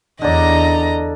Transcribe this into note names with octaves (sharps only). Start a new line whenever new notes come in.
E2 D3 D5 D#5 A#5